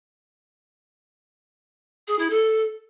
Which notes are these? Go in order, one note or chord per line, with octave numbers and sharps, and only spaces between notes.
G#4
E4
A4